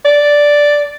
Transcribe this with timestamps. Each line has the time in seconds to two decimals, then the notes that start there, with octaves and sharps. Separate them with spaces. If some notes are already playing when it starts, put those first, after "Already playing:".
0.05 D5